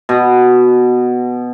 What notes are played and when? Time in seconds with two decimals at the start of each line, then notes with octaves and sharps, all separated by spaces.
0.09 B2